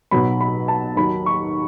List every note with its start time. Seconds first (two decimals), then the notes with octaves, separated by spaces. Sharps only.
0.11 B1 B2 F#3 B5
0.41 B5
0.68 A5
0.97 D#2 D#3 F#3 B5
1.26 C#6